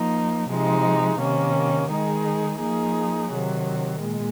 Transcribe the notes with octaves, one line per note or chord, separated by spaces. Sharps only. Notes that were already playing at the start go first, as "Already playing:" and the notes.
Already playing: F3 A#3 D#4
C3 F3 G#3 D#4
C3 D#3 A#3 C#4
D#3 G#3 D#4 G#4
F3 A#3 D#4 G#4
C3 D#3 F#3
A#2 G#3